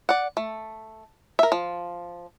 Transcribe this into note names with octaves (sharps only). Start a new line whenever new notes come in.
D5 F#5
A3
A#4 E5
F3